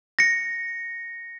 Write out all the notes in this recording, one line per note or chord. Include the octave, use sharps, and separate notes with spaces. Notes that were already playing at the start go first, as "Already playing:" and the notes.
A#6 C#7